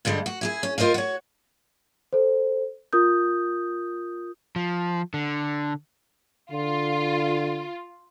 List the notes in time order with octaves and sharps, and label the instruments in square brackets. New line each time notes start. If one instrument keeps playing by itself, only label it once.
[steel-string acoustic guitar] G2 D3 G3 G#3
F#4
E4 G4 G#4
C#4
F4 A#4 C5 D#5 F5
F#4 C#5
[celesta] A4 C5
F4 A#4 D#6 G6
[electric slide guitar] F3
D3
[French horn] D3 [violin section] F4